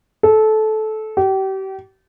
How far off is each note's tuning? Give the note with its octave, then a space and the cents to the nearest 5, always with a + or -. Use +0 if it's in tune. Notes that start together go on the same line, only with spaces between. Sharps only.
A4 -20
G4 -35